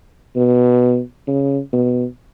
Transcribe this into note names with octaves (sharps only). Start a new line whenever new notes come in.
B2
C#3
B2